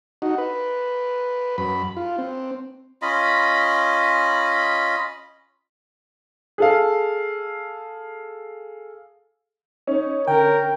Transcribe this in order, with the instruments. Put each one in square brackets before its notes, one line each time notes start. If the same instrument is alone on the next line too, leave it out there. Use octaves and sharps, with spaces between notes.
[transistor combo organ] D#4 F#4
B4
F#2 B5
F4
C4
[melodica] C#4 F4 D#5 B5
[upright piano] G#4 A4 F5
[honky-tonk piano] C#4 [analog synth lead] D#4
[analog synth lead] D3 [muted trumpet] A#4 [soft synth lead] G5